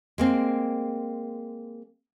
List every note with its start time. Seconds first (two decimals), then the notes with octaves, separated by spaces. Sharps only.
0.18 G#3 A#3 C4